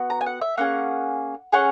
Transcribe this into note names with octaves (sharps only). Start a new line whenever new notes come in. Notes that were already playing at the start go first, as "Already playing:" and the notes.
Already playing: B3 F#4
A#5
G#5
F#5
E5
A#3 C#4 G#4 F#5
C#4 G#4 F#5